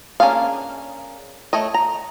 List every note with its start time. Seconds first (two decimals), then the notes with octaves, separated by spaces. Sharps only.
0.20 A#3 C#4 D4 G#4 F5
1.53 A3 C#5 D#5
1.74 A#5